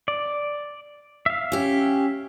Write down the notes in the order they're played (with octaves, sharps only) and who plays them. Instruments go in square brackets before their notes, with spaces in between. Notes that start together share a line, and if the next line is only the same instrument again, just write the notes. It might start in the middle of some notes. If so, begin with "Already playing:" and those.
[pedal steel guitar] D5
E5 F5
[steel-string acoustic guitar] C#4 G4